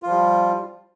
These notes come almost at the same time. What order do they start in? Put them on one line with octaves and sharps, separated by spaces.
F4 F3 G3